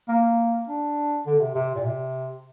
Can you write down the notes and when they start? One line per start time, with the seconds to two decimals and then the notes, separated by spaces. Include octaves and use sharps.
0.08 A#3
0.67 D4
1.26 D3
1.41 C3
1.55 C3
1.75 A#2
1.85 C3